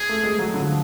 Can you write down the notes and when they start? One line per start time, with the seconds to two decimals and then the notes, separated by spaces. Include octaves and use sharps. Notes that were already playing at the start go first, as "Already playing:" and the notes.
Already playing: G#4
0.09 A3
0.23 G#3
0.39 F#3
0.54 D3
0.59 F#3
0.64 F3